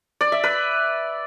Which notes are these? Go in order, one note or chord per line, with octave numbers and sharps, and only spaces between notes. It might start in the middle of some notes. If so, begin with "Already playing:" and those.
D5
E5
B4